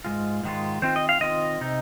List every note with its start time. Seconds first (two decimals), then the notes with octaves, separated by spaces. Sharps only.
0.04 G#2 D#3 G#3 F4
0.44 G#2 D#3 G#3 F4
0.82 D#3 C4 F4 C5
0.96 D#5
1.09 F5
1.21 D#3 C4 F4 D#5
1.61 C3 D#4